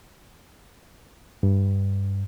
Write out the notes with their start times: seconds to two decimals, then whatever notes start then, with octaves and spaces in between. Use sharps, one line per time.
1.43 G2